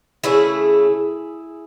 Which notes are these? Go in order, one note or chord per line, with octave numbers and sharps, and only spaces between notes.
C#3 E3 A3 E4 G#4